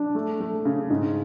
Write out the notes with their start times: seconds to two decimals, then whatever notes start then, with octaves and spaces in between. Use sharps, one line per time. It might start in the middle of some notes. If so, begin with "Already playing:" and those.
Already playing: D4
0.15 A3
0.40 A3
0.65 C#3
0.90 G#2